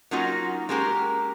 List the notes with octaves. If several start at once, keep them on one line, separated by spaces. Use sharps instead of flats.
F#3 A#3 C#4 D#4 F4 F#4
G#3 A#3 C#4 F#4 G4 A#4